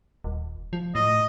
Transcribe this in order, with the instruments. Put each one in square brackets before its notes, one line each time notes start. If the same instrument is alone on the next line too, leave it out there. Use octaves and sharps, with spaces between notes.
[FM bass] D#1
F3
[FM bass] A2 [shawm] D#5